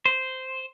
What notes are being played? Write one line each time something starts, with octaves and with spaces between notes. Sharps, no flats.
C5